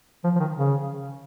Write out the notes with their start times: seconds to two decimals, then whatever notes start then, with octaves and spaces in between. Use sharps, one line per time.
0.24 F3
0.36 F3
0.40 D#3
0.56 C#3